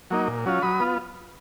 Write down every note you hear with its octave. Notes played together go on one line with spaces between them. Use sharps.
F#3 A#3 D#4
A#2
F#3 C#4 F4
F#3 B5 D#6
B3 F4